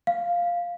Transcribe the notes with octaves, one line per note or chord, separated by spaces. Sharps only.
F5